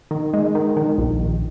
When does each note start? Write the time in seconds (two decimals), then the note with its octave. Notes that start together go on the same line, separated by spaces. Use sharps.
0.11 D#3
0.33 G#3
0.55 D#3
0.77 D#3
0.98 A#1
1.20 A#1